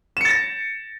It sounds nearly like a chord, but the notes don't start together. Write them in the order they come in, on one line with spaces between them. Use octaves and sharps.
E7 C#7 A6 A#6